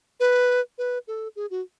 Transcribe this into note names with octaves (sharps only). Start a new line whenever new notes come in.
B4
B4
A4
G#4
F#4